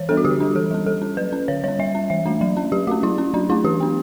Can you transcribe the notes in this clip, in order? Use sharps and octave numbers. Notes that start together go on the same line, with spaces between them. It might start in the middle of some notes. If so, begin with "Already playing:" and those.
Already playing: E3 C#5
G3 B3 D4 A4
F#4
D3 G4
G3 D4
E3 A4
G3 C#4
G3 A4
C#4
F#3 B4
C#4
D3 C#5
G3 C#4 C#5
G3 E5
C#4
E3 E5
A3 D4
F#3
C#4
F#3 G4
A3 C#4 F#4
F#3 E4
C#4
F#3 D4
A3 C#4 E4
E3 G4
B3 D4